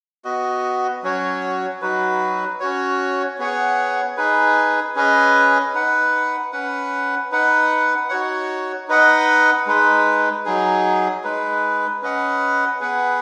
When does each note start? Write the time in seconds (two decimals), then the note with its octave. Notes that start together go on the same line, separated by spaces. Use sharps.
0.25 B3 F#4 D#5
1.03 F#3 C#4 F#4 C#5
1.81 F#3 D#4 F#4 B4
2.60 C#4 F#4 C#5
3.39 B3 G#4 C#5 F#5
4.17 D#4 G#4 B4
4.95 C#4 G#4 B4 D#5
5.74 D#4 B4 F#5
6.52 C#4 B4 F#5
7.31 D#4 B4 F#5
8.09 D#4 F#4 C#5 F#5
8.88 D#4 B4 D#5 F#5
9.66 G#3 D#4 B4
10.45 F#3 D#4 G#4
11.24 G#3 D#4 B4
12.02 C#4 B4 D#5 F#5
12.80 B3 G#4 B4 F#5